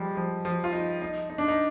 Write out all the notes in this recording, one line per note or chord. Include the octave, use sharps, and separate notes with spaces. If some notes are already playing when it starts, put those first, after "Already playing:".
Already playing: F3 G3 G#3
F3
F3
F4
D#4
D#4
D#4
D4
D#4